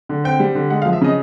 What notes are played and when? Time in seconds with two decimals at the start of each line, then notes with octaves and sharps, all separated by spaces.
0.09 D3
0.24 C4 G5
0.40 G3
0.55 D3
0.70 G#3 F#5
0.82 F5
0.86 F3
0.93 E5
1.01 C#3 D#5